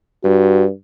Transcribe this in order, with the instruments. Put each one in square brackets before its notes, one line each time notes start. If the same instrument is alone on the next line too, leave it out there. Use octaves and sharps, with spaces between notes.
[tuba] G2 [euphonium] F#4